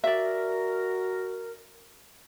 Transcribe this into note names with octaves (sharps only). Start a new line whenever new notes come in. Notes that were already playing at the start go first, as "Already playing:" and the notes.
F#4 A#4 D5 E5